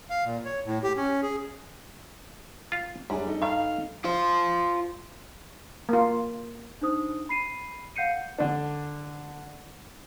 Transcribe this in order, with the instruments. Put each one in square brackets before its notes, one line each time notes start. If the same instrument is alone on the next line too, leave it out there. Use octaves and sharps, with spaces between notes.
[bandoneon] F5
A#2
C#5
A2
G4
C#4
G#4
[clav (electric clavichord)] F4 F5
[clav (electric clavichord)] F#2 [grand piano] G3 D4 G#4
[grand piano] D#4 A4
[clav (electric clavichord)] G2 D#3 [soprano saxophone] F5
[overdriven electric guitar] F4 C5
[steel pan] A#3 F4
[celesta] D4 D#4 C5 D#6
B5 C7 D#7
F5 F#5 G6 C7 C#7 D#7
[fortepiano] D3 D4